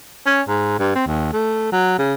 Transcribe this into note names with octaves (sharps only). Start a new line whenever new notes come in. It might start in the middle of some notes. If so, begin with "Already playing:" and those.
C#4
G#2
G2
C4
D#2
A3
F#3
C#3